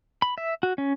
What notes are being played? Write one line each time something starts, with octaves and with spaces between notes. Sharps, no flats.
B5
E5
F#4
C#4